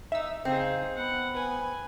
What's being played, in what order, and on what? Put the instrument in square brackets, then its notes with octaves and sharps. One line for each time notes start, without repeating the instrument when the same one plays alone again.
[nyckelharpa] D#4 [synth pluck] E5 E6
[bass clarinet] C#3 [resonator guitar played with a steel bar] C4 [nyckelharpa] D#4 G#4
[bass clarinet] B3 [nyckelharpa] F#5
[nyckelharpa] B4 G#5